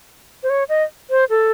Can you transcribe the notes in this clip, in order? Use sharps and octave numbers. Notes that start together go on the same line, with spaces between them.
C5
C#5
D#5
C5
A4